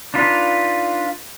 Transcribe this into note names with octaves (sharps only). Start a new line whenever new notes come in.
D4 D#4 F4 B4